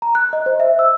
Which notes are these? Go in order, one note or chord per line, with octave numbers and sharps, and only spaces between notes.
A#5
F#6
D#5
C5
E5
E6